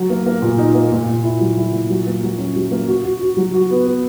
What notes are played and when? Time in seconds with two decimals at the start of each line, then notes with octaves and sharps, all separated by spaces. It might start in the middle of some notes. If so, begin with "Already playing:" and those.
Already playing: F#3
0.10 A#3
0.26 A#3
0.42 A#2
0.58 D#4
0.74 A#3
0.92 A#2
1.08 A#2
1.24 E4
1.41 F#3
1.57 E4
1.73 A#2
1.90 F#3
2.07 A#3
2.23 F#3
2.38 C#4
2.56 F#3
2.71 A#3
2.87 F#4
3.04 F#4
3.21 F#4
3.37 F#3
3.54 F#4
3.71 B3
3.86 B3